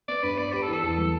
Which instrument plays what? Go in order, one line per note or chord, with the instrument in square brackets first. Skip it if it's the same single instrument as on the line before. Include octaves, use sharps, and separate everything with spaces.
[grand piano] B3 [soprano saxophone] D5
[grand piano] G2 [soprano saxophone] B4
[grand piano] B3 [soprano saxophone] D5
[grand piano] G4 [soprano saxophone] B4
[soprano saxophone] A4
[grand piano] E3
[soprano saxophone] A4
[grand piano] E2
G3